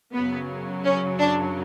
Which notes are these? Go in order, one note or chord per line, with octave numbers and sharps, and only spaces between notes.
F#2 C#3 F#3 B3
C#4
D4